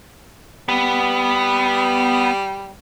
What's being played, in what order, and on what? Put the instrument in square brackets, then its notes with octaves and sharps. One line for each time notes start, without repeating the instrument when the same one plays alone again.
[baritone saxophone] G3 [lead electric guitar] B3